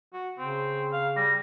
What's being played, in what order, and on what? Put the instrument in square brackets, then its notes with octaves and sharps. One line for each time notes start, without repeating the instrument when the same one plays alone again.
[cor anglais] F#4
[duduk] C#3 [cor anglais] C4
[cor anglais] F5
[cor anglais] G3 [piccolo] A#6